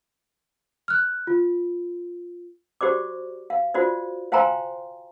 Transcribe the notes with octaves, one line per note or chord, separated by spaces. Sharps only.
F6 F#6
F4
F#4 G4 C5 D5 D6
F5
F4 F#4 C5 D5
C5 F5 G5 G#5 A#5 C6